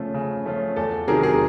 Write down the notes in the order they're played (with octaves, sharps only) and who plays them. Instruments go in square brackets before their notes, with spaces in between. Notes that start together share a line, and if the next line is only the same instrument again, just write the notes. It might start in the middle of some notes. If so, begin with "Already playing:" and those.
Already playing: [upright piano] C#3 F3 A3 C#4 F4
C#3
F3 A3 C#4 F4
E2 A4
C3 D#3 F#3 G#4 A#4
G#4 A#4